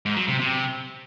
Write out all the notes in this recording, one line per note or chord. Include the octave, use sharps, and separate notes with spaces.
G#2
F#3
C3
C3